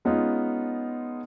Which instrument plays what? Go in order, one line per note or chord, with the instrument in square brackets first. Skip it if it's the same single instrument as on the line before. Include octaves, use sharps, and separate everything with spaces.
[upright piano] G#3 B3 C#4 D#4 F4